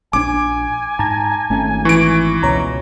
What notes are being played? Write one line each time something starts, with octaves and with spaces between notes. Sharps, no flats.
A#1 C4 D4 G#5 D6
G#2 A5 A#5 G#6
G#1 A3 C#4
E3 C#6 D7
C#2 B2 C#5 A#5